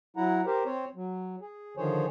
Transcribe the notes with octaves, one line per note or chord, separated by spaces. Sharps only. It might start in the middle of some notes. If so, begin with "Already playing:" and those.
F#3 E4 F#5 A#5
G4 A#4 C5
C4 C5 C#5
F#3
G#4
D3 D#3 F3 G#4 C5 C#5